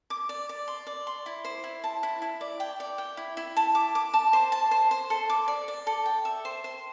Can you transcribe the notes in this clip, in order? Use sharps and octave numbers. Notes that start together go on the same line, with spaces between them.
D6
D5
D5
C6
D5
C6
E4
C5
E4
A5
E4
E4
D5
G5
D5
G5
E4
E4
A5
D6
D6
A5
C5
A5
C5
C5
A4
D6
D5
D5
A4
G5
E5
C5
C5